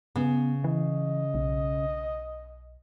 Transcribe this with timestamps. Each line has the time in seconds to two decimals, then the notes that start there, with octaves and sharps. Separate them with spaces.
0.16 C#3 B3
0.64 E3 D#5
1.34 B1